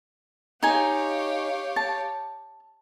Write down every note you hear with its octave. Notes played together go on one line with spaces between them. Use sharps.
D#4 G4 C#5 F5 G#5
A5